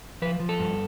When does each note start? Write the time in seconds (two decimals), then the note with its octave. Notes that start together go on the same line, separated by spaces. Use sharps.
0.22 F3 B4
0.40 F3
0.49 A4
0.59 G2